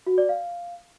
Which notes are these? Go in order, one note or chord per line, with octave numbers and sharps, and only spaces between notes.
F#4
D5
F5